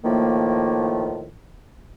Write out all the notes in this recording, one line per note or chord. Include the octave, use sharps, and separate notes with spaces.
A2 D#3 F3 A3 A#3